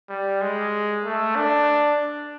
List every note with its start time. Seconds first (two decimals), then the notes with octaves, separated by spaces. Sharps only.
0.10 G3
0.41 G#3
1.04 A3
1.36 D4